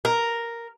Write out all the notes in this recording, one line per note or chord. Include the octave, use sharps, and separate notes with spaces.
A#4